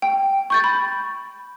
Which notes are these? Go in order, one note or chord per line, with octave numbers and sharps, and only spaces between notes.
G5
C#6 G6 A6
B5